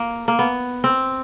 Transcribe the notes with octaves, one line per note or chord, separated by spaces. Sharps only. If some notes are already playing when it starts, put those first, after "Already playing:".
Already playing: A#3
A#3
B3
C4